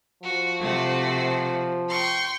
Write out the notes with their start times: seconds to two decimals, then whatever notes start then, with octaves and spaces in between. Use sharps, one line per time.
0.23 F3 F#4
0.60 C3 A3 F#4
1.89 G5 C6 C#6